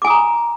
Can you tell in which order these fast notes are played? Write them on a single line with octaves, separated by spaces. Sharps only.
D6 G#5 D#6 A#5